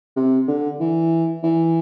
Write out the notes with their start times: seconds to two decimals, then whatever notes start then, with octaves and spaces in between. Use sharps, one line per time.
0.16 C3
0.48 D3
0.80 E3
1.43 E3